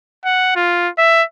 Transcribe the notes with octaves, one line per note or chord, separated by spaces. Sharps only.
F#5
F4
E5